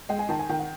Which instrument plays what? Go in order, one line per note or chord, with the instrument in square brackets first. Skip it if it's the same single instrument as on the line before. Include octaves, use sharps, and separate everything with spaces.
[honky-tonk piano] G#3 [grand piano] G5
[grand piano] G#5
[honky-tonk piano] D#3 [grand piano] A5
[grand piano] G#5
[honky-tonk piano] D#3 [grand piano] G5
[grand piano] F#5